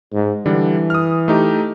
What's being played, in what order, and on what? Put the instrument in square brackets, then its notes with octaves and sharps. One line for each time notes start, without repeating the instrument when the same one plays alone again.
[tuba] G#2
[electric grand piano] D3 G3 D4 [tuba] E3
[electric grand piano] D#6 F6
A3 D#4 G4